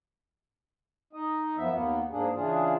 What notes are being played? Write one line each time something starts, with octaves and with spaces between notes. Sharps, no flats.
D#4 D#5
F#2 F3 B3 E5
D#2 A#3 B3
G#2 A#3 D4 G#4
C#3 E3 D4 F4 G#4